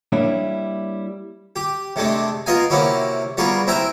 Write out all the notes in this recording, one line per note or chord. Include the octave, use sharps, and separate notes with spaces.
G3 A#3 D4 E4 C#5
G4
C3 G#3 A3 D4
B3 F4 A#4 D#5 F5 G#5
C3 A#3 C#4 E4 F#4
G3 B3 F4 F#4 G#4 A#4
C4 E4 A#4 E5 G5 G#5